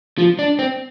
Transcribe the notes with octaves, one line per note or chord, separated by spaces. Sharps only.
F3
D4
C4